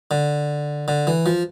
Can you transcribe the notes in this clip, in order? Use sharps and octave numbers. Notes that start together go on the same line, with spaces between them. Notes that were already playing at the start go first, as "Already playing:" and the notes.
D3
D3
E3
F3